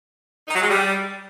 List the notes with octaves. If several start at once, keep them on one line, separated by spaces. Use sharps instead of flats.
D#4
F#3
G#3
G3